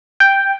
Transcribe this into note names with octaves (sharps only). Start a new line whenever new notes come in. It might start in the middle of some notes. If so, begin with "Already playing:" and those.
G5